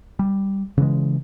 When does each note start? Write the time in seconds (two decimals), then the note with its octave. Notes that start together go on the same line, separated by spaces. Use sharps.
0.19 G3
0.78 C#3 E3 G#3